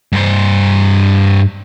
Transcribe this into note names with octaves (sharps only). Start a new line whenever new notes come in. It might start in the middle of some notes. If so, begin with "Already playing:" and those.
G2 C5